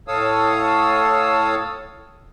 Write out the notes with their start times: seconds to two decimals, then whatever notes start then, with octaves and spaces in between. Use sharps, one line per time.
0.08 A2 A4 C#5 F5 D#6 E6